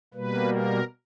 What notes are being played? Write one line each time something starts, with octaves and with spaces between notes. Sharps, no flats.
B2 G3 A#3 B4
A#4